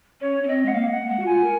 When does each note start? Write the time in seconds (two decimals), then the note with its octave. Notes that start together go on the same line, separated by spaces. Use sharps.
0.21 C#4 C#5
0.43 C#4
0.48 C4 D#5
0.66 G#3 F#5
0.74 A#3 F5
0.92 F#5
1.09 G#3 F#5
1.20 F#4
1.25 F4 G#5
1.44 A#4